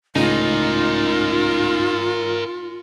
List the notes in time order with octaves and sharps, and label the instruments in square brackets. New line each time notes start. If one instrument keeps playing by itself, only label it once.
[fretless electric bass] C#2 A2 C#3 [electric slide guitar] D#4 [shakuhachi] F4 [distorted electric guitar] A#4 G#5